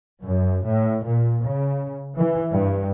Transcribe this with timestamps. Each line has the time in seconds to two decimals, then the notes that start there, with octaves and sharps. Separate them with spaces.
0.22 F#2
0.65 A2
1.06 A#2
1.44 C#3
2.16 E3
2.51 G2